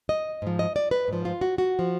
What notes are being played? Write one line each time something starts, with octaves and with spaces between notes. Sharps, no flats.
D#5
G#2 F3
D#5
D5
B4
G#2 F3
F4
F#4
F#4
F3